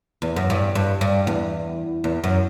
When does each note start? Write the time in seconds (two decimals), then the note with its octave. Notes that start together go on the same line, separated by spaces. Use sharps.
0.22 E2
0.36 F#2
0.50 G2
0.75 G2
1.01 G2
1.27 E2
2.04 E2
2.24 F#2